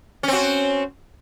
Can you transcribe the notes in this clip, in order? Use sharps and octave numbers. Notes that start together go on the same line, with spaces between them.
C4 C#4 F#4